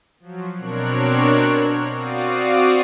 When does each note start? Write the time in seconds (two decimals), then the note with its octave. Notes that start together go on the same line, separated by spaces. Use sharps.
0.20 F3 F#3
0.58 B2 C4 D4 A#4 C#5 F#6
1.93 C4 F#4 D5 F5 D#6